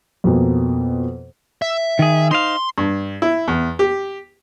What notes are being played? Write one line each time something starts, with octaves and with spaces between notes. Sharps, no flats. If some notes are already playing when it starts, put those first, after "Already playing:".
F2 B2 A#3
E5
D#3 G#4
D#4 C5 F5 C6
G2
E4
E2
G4